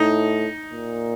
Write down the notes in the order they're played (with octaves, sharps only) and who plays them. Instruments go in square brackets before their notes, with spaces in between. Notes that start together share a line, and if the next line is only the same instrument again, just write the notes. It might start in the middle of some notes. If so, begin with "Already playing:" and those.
Already playing: [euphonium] A2 [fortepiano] D#4
[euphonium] A#2